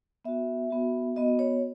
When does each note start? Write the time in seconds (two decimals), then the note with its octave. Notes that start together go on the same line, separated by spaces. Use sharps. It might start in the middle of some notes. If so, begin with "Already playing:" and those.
0.25 B3 F#4 E5
0.70 B3 F#4
1.16 B3 F#4 D#5
1.39 C#5